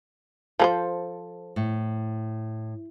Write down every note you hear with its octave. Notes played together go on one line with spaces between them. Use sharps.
F3 A4 A#4 C5
A2